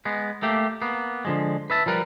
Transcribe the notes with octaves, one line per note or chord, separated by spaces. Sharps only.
G#3 B3
A3 A#3 G4
A#3 B3
D3 F3 G#3
B4 E5 A5
F3 G3 A#4 B4